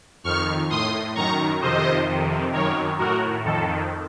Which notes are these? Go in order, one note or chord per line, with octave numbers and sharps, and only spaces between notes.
F2 D#3 C#6 F6
A2 C6 D#6
F#2 D#3 A#5 C#6
F2 C3 D#3 C5 D#5
F2 C3 D#3
F#2 D#3 A#4 C#5
A2 F#4 A#4
F2 D#3 A4